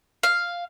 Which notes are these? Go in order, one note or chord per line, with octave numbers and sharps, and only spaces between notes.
F5